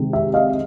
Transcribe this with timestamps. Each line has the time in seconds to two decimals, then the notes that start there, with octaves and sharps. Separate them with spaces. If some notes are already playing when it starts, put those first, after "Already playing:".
Already playing: C3 D#3 G#3
0.13 E5
0.34 D#5 F5